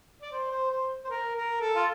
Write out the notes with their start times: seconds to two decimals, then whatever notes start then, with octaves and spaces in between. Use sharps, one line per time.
0.22 D5
0.32 C5
0.51 C5
0.71 C5
1.04 C5
1.10 A#4
1.36 A#4
1.61 A4
1.75 F4